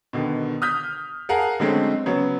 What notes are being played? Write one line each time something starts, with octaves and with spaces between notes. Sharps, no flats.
B2 D3 D#3
D#6 F6 G6 B6
G#4 A#4 F5 F#5 G#5 A5
D3 F#3 G#3 A3 C4 C#4
C#3 F#3 B3 C#4